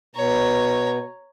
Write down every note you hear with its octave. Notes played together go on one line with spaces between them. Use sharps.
B2 C#5 A#5